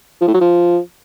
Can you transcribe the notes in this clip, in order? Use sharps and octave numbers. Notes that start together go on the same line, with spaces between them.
F3
A2
F#3
F3